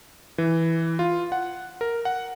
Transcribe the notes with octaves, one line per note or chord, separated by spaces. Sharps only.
E3
F4
F#5
A#4
F#5